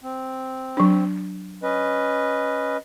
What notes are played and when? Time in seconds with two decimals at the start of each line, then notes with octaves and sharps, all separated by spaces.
0.03 C4
0.77 F#3 D4
1.63 C#4 B4 D#5